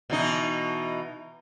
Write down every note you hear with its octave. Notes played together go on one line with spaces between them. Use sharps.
B2 E3 D#4